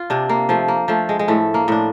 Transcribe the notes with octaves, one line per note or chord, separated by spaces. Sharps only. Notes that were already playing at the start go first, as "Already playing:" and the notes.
Already playing: F4
C3 D4
A#3
F3 A3
A#3
F3 A3
G#3
G#3
A2 A3
A#3
A2 D4